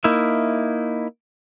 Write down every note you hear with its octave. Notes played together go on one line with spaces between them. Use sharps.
A#3 D#4 E4 E5